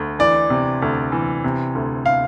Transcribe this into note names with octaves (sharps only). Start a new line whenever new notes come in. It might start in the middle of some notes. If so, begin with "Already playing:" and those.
Already playing: D2
E3 D5
C3
D2
E3
C3
D2
F5